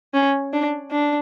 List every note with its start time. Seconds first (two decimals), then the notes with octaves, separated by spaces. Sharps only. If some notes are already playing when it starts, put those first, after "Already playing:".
0.14 C#4
0.53 D4
0.92 D4